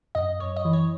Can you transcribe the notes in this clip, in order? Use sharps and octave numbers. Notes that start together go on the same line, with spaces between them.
F#2 D#5
F#2 C#5
D#5
E3
C#5